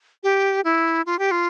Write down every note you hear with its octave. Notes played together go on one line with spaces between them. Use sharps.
G4
E4
F4
G4
F4